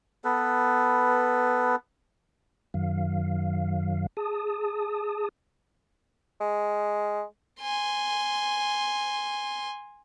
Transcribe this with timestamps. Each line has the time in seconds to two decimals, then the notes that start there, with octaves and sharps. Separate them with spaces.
0.24 B3 A4 B4
2.74 F#2 D#3 F#3 F5
4.17 G#4 A5 D#6
6.41 G#3
7.61 G#5 C6